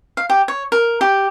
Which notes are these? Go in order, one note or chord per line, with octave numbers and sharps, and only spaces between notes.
F5
G4
C#5
A#4
G4